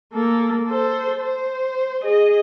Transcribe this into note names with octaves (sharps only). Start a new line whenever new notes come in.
A#3 A4
A4 C5
C5
G#4 D#5